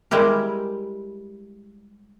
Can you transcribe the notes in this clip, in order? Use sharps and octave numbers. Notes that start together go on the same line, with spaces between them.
G3 G#3 E4 G4 A#4